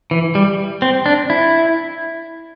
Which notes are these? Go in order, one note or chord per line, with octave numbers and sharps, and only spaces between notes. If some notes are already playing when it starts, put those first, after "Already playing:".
E3
G3
C4
D4
E4